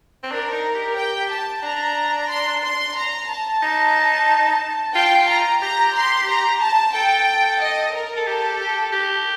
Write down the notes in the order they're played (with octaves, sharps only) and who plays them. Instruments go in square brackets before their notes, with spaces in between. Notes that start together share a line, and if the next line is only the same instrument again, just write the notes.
[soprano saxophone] C4
[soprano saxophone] D4 [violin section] A#4
[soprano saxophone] D#4
G4
[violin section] G5
A5
[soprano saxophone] D4 [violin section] A#5
[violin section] C6
C6
A#5
A5
[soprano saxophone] D#4
[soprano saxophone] F4 [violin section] G5
[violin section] A#5
[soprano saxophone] G4 [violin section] A#5
[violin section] C6
A#5
A5
[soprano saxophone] A4 [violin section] G5
[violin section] D#5
A#4
[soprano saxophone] A4
[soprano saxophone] G4 [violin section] A4
[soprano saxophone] G4
G4